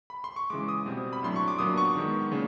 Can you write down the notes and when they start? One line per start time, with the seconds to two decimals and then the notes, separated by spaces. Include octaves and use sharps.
0.10 B5
0.24 C6
0.36 C#6
0.50 C#3 E3 G#3 D6
0.69 D#6
0.86 B2 G3 C4
1.13 B5
1.23 A2 F#3 A3 D4 C6
1.36 C#6
1.48 D6
1.59 A#2 F#3 B3 D4 D#6
1.78 C#6
1.95 D#3 G#3 B3
2.31 C#3 F3 A#3 D4